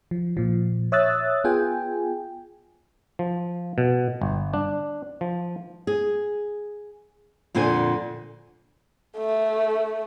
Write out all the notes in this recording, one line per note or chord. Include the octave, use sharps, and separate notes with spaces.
F3
A#2 F3
C#5 E5 D#6 E6 F#6 A6
B3 F4 G#4 G5 G#5
F3
B2
G1
D4
F3
G#4
F2 A#2 D3 C5 G#5
A3